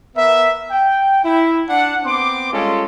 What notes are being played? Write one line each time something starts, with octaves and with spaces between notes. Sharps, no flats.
B3 A#4 E5
G5
E4
D4 F#5
B3 C4 C6 D6
G3 G#3 C#4 F4 A4